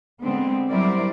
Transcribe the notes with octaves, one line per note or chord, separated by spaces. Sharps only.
D3 G#3 B3 C4
F#3 G3 E4 A#4 C5 D5